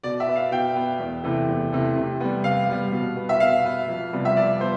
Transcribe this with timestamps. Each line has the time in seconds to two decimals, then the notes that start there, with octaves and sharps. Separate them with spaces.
0.03 B2 D5
0.20 E5
0.28 B3
0.36 F5
0.52 B2 G5
0.76 B3
1.00 E2
1.24 C3 E3 A3
1.48 E2
1.72 C3 E3 A3
1.96 C3
2.20 G3 B3
2.44 C3 F5
2.69 G3 B3
2.92 B2
3.17 B3
3.29 E5
3.40 B2 F5
3.65 B3
3.89 F2
4.13 C3 G3 B3
4.25 E5
4.37 F2 D5
4.60 B3 C5